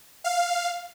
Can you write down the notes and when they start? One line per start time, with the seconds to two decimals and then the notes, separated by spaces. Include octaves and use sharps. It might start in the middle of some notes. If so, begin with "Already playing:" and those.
0.24 F5